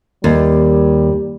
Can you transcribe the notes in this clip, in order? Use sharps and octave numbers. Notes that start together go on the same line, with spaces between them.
D#2 G3